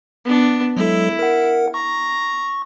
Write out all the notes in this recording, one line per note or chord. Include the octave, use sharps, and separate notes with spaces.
B3 D4
F#3 G#3 E4 A4
A#4 F#5
A#5 C#6